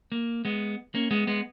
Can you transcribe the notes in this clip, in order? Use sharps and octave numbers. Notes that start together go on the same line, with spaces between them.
A#3
G#3 B3
A#3 C#4
G#3 B3
G#3 B3